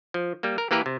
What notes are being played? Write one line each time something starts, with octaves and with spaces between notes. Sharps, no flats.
F3
G3 A#3
A#4
E3 A#3 G4 A#4 B4
C3